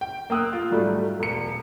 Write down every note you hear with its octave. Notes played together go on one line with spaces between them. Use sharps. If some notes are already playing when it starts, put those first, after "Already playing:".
G5
A#3 G5 D#6 E6 F#6
F4
G#2 F#3 G3 A3
E1 C#7